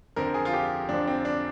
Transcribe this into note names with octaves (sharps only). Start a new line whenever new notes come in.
F2 D3 F3 A#4
G#4
F4
G4
F2 D3 F3 D4
C4
D4